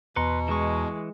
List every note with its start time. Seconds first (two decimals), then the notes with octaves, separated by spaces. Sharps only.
0.16 E2 B2 B4 A#5 C6 C#7
0.48 E3 G#3 C#6